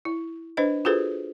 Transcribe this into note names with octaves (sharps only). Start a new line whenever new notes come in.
E4
D4 B4 C5 D#5
F4 F#4 G#4 A4 B4 C5